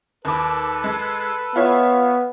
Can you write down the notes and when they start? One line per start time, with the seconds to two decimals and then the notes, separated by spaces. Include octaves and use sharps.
0.25 D#2 A4 B4 D6
0.84 G#3
1.56 B3 F4 C#5 E5